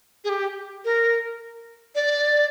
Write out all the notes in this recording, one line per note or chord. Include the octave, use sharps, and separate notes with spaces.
G#4
G4
A#4
D5